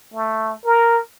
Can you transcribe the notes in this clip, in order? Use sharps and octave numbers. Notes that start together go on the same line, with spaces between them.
A3
A#4